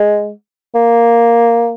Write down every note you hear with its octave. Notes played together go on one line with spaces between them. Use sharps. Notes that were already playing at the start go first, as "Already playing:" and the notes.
Already playing: G#3
A#3